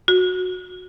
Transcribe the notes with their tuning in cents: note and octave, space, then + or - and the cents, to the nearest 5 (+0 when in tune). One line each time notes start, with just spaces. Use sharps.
F#4 -15